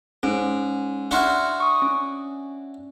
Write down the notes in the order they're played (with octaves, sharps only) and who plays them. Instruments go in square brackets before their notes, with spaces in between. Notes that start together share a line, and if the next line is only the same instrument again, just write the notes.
[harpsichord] G#2 [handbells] C#4
[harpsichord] D4 E4 F#4 [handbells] F#5 C6 F6
[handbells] C#6 D#6
C#4